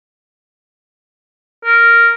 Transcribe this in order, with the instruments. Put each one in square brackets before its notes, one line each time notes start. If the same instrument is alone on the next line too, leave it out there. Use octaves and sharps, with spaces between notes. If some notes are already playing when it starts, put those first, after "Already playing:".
[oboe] A#4